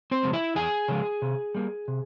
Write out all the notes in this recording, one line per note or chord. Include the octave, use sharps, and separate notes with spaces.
C4 C5
C#3 F3 G#3
E4 E5
E2 G#4 G#5
C#3 F3 G#3
C3
G3 A#3
C3